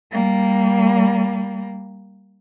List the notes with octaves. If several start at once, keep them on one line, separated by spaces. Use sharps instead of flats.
G3 A#3